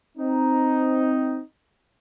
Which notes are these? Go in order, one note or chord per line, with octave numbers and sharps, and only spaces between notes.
C4 D#4